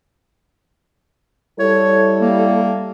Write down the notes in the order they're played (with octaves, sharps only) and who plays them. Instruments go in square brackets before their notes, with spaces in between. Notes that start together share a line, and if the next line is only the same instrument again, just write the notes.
[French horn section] G3 E4 A4 [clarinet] C#5
[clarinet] A#3